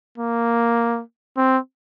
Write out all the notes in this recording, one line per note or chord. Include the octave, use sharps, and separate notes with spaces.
A#3
C4